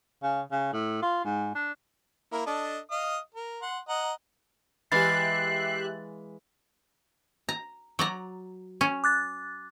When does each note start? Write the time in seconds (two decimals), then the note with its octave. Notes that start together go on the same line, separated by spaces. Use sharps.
0.22 C#3
0.51 C#3
0.73 A2
1.02 F4
1.25 G#2
1.55 D4
2.32 A#3 E4 A#4
2.46 D4 A4 D#5
2.91 D#5 F5 D#6
3.34 A#4
3.62 F#5 C6
3.89 D#5 F#5 A#5
4.92 E3 G#3 G4 E5 F5 F#6 A6 C7
7.49 A#5
7.99 F#3 D5 A#5
8.81 C#4
9.04 D6 F#6 A6